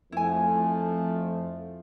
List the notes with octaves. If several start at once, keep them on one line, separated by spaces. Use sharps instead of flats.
F2 F3 A3 E4 G#5